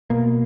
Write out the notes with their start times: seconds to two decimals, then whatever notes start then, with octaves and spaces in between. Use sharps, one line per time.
0.10 B2 A#3